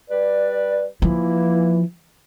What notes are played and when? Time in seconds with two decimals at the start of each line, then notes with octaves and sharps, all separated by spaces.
0.10 G3 B4 D5
1.02 E3 F3 A#3 E4